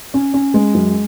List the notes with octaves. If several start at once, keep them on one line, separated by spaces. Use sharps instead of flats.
C#4
C#4
G#3
F#2